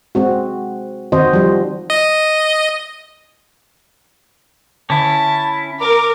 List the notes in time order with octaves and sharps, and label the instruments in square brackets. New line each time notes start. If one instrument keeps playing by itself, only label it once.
[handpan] G#3 C4 F#4
D#3 C4 F#4 C5 D#5
F3 G3
[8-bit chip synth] D#5
[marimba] D3 [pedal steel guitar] C#4 E4 [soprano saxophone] A5
[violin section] A#4 [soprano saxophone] D6